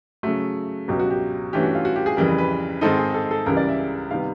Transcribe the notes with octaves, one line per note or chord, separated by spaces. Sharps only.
C#3 F#3 A3 F#4
C#2 B2 F#3 G4
F#4
G4
G2 E3 A3 C#4 G4
F#4
F4
F#4
G4
G#4
F2 C#3 E3 G3 A#4
B4
B4
G#2 D#3 G#3 C4 D#4 A4
G#4
A4
A4
C#2 C#3 E3 G3 A#4
D5
E5
C3 D#3 G3 B3 F5